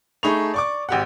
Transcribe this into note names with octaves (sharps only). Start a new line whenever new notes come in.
A3 D#4 G#4 B5 C#6 F7
D5 C#6 D6
G#1 G4 F#5